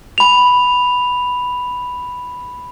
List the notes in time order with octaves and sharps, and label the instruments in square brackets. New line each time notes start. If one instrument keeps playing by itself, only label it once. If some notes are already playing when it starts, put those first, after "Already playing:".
[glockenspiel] B5 F7